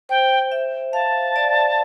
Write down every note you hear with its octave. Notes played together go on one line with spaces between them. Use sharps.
C5 G5
E5
F5 A5
D5